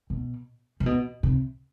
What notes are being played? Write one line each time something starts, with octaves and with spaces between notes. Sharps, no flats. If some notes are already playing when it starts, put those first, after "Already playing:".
B2
C3
B2
C3